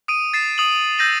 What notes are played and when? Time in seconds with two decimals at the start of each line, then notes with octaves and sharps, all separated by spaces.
0.08 D#6 D7 D#7
0.34 A6 C7 E7
0.58 D#6 F#7
0.98 E6 G6 A#6 D#7 F#7